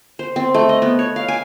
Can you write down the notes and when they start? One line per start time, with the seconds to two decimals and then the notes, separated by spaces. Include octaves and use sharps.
0.19 C5
0.36 C4
0.54 A3
0.69 D#5
0.82 B3
0.99 C#5
1.16 F5
1.28 G#5